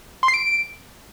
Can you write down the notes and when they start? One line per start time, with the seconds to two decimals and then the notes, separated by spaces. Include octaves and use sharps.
0.23 C6
0.28 C7
0.34 D7